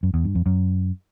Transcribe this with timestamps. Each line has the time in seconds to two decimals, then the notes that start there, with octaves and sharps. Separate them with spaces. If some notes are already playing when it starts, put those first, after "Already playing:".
0.03 F#2
0.14 E2
0.24 G2
0.35 F2
0.46 F#2